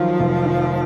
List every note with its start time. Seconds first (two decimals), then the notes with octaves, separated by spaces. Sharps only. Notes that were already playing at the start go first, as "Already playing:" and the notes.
Already playing: D#3 F3 F#3
0.20 F1
0.45 D#3